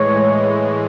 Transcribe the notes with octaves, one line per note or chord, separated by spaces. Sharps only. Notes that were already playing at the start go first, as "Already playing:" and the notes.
Already playing: A2 E3 G#3 C#5